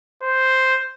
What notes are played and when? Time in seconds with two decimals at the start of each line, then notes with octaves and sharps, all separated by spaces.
0.22 C5